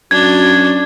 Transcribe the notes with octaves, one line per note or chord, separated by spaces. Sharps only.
F#2 D4 F#4 G#6